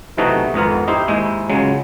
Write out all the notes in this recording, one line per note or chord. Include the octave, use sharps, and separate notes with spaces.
B1 C3 E3 A3 D#4 F#4
G#1 F2 B3 A#4
D#4 E4 G4 C5
D#2 G#2 G#3 E4
C#2 C#3 F#3 G#3